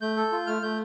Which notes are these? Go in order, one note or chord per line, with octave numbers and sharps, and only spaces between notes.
A3 G6
A4
F4
A3 F6
A3 G6